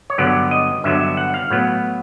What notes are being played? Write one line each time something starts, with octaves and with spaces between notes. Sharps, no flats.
C#5
G2 D3 F#3 B3 D5
D#5
G2 D3 F#3 B3 E5
E5
F#5
F5
A2 F#3 B3